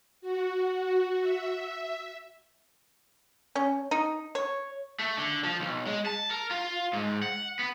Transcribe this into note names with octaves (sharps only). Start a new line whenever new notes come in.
F#4
E5
C#4
D#4
C#5
A3
D3
F3
B1
G#3
A5
A#4
F4
G#2
F#5
B3